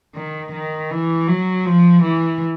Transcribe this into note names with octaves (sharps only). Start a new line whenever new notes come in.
D#3
D#3
E3
F#3
F3
E3